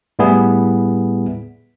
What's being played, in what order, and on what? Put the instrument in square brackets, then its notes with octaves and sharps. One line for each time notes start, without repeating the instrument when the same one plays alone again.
[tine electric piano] A2 G3 B3 E4 G#4